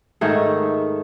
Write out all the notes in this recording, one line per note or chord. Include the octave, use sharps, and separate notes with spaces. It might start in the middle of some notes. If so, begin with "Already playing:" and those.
G#2 D#3 A3 G#4